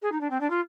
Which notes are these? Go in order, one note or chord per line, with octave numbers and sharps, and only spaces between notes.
G#4
D#4
D4
C4
D4
F4